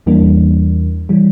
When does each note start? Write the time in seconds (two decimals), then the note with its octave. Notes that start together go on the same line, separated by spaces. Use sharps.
0.06 E2 E3 G3 A#3 D4
1.09 E3 G3